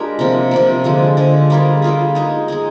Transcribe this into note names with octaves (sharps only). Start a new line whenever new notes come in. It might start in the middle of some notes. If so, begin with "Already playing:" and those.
Already playing: G#3 D4 F4 G4 A#4
C3 F3 A#3
C3 F3 A#3
D3 F3 G#3
D3 F3 G#3
G3 A#3 F4 G#4
G3 A#3 F4 G#4
G#3 D#4 G#4
G#3 D#4 G#4